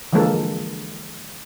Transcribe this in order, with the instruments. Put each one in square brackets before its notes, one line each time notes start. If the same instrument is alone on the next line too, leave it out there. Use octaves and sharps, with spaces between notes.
[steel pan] D3 E3 F3 G#3 A#3 A4